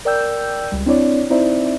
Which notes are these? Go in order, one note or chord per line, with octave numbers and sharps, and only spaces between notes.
A#4 D5 G5 E6 G6
C#2 G3
C4 D4 E4 C#5 D5
C4 D#4 E4 C5 D5 E5